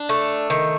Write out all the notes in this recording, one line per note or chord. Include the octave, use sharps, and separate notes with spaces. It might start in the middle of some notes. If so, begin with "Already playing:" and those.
Already playing: D4
A3
D#3